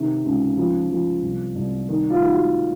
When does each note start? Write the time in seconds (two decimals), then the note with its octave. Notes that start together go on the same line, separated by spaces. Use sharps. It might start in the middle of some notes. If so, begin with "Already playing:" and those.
Already playing: C3 D#3
0.25 C#2
0.57 F3
0.90 F3
1.23 C2
1.56 C2
1.89 D#3
2.10 F4
2.20 D#3
2.32 F#4